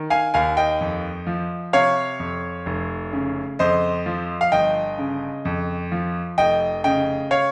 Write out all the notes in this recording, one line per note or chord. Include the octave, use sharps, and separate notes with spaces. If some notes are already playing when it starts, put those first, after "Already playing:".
Already playing: D#3
F5 G#5
D#2 F5 G#5
D#5 G5
F2
F3
C3 C#5 F5
F2
F1
C#3
F2 C5 D#5
F3
F5
G1 D#5 G5
C#3
F2
F3
F1 D#5 G5
C#3 D#5 G5
C#5 F5